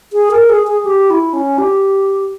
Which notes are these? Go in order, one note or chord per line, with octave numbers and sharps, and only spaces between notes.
G#4
A#4
G#4
G#4
G4
E4
C#4
G4